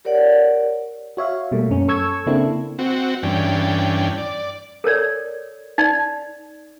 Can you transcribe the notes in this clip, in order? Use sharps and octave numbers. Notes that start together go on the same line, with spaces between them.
G4 A#4 C#5 D5 F#5
F#4 C#5 E5 F5
B2 G3 A3 A#3
F#2 C#4
A4 C#6 E6 G#6
C#3 A#3 C4 D4 E4 A4
C4 F#4
G2 E3 C#4 D4 G5
D5
A4 A#4 C#5 D5
D#4 D5